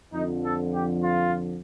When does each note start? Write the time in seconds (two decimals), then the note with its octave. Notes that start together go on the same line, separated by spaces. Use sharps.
0.13 F2 D3 F3 D#4
0.43 A4
0.74 G4
1.04 F4